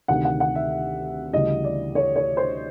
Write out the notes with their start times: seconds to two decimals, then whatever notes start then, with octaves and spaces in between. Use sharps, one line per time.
0.08 D2 C3 D#3 F#5
0.25 F#5
0.40 F#5
0.55 E5
1.33 D2 C#3 E3 G3 D#5
1.64 D5
1.95 C#5
2.16 C#5
2.37 C5